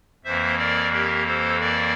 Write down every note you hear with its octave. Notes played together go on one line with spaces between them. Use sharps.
F2 E3 A#3 C5 E5
A#4 D5
G4 A#4
A4 C5
A#4 D5